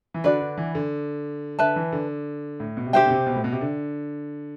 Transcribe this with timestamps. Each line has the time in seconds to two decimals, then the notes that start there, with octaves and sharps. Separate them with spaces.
0.14 E3
0.24 D3 D4 F#4 B4 D5
0.41 D3
0.57 E3
0.75 D3
1.59 D3 B4 E5 A5
1.76 E3
1.92 D3
2.60 A2
2.77 B2
2.86 C3
2.93 D3 G4 C5 E5 G5
3.06 B2
3.10 C3
3.26 B2
3.36 A2
3.44 B2
3.52 C3
3.61 D3